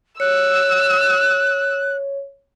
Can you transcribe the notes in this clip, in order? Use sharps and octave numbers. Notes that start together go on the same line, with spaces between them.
C#5 E6 F#6